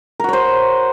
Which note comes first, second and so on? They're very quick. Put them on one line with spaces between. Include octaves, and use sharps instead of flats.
A#4 F#4 C#5 C5